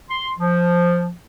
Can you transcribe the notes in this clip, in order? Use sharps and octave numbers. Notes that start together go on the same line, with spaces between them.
C6
F3